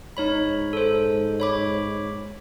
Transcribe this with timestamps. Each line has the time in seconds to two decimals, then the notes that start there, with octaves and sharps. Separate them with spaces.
0.17 G#2 D#4 C#5 B5
0.73 A4 C5
1.40 C#5 B5 D6